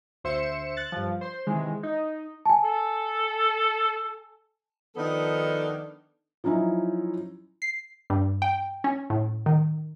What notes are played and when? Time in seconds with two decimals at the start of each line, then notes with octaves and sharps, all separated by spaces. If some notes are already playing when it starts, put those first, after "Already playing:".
0.24 D2 C5 E5 C#7 E7
0.77 F#6 A6
0.92 G2 F3
1.21 C5 C6
1.47 C3 D#3 E3 G#3
1.83 D#4
2.46 G#5 A5
2.64 A4
4.96 D#3 F3 B3 D4 D#4 A4
6.44 F3 F#3 C#4 D#4 E4
7.62 C7
8.10 G2
8.42 G5
8.84 C#4
9.10 A2
9.46 D#3